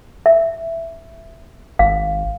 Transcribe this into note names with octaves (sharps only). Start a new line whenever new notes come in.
E5
G#1 F5